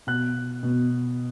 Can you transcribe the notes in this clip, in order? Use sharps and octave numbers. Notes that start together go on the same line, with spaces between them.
B2 F#6
B2